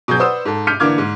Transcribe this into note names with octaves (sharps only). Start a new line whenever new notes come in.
B2 F#3 G#4 G6
B4 C5 D5 F#5 D#6 E6
G#2 A4
D6 F6 G6 B6 C#7 D#7
D3 E3 A#3 D6 F6 G#6
G#2